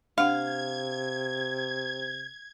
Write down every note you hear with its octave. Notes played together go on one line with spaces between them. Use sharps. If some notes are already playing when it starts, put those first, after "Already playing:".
C3 D4 F5 F#5 G#6